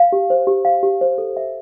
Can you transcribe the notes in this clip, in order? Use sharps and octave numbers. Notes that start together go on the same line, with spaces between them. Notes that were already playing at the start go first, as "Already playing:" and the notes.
Already playing: F5
G4
C5
G4
F5
G4
C5
A4
E5